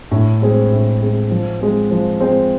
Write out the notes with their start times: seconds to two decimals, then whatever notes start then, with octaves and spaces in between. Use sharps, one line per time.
0.11 A2
0.41 G#3 C4 G#4
0.72 A2
1.01 G#3 C4 G#4
1.31 F3
1.61 G#3 C4
1.91 F3
2.20 G#3 C4